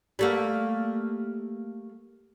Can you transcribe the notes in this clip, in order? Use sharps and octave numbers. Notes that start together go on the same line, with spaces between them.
G3 A3 A#3